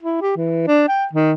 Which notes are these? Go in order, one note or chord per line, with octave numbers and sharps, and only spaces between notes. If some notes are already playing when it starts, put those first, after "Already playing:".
E4
G4
E3
D4
G5
D#3